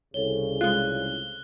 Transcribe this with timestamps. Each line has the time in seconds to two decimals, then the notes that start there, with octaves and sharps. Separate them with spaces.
0.14 C2 C#3 A4 C#5 G7
0.61 G#3 F4 F5 F#6 G7